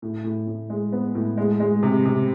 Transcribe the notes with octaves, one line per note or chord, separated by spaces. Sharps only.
A2
A2
A2
G#3
B3
A2
G#3
G#3
C3
C3